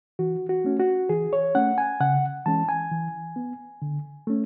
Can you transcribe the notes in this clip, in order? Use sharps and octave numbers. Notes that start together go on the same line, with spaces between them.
E3 F#4
F#4
A3 C#4
F#4
E3 G#4
C#5
A3 C#4 F#5
G#5
C#3 F#5
E3 G#3 C#4 A5
G#5
E3
B3
D3
A3 C#4